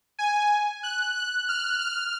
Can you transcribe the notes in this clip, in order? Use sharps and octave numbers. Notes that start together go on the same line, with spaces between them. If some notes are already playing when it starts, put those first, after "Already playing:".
G#5
F#6
F#6
F6
F6